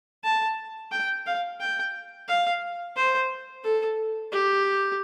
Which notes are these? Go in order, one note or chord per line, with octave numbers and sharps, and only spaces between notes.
A5
G5
F5
G5
F5
C5
A4
G4